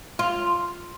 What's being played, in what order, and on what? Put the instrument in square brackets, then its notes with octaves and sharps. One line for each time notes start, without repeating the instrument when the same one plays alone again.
[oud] F4